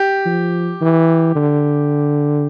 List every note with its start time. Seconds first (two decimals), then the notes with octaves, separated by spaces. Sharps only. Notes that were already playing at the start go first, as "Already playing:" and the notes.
Already playing: G4
0.26 F3
0.81 E3
1.35 D3